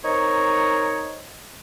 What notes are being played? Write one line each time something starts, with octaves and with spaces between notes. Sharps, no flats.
C4 D#4 A#4 C#5